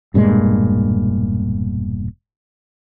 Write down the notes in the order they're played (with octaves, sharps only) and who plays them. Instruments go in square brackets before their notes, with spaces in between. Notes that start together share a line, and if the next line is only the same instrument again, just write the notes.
[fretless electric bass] E1 G2 A#2 G#3